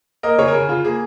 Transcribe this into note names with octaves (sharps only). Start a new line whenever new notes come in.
A#3 A#4 D#5
C#3 G#4 C#5
A#4
C#3 G#4
C#3 F4
A#3 G#4